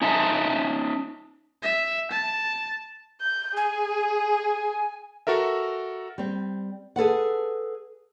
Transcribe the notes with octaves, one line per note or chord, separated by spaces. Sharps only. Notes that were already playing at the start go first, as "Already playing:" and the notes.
C#4 D#4 E5 G5 A5
E5
A5
G6
G#4 G#5
F#4 A4 A#4 E5
G3 C4
G#4 A4 B4 F#5